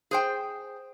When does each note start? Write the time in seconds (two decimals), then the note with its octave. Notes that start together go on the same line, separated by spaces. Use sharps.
0.11 G#4 C5 G5